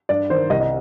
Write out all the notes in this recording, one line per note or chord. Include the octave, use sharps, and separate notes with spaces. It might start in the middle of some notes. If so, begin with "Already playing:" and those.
G2 D5
D#3 C5
C2 D#5
D#5